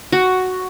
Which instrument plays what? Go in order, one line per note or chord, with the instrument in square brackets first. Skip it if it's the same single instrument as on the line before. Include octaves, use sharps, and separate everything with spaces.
[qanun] F#4